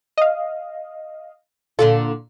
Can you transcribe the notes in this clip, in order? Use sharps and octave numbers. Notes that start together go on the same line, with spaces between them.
D#5 F5
A#2 D3 F4 A4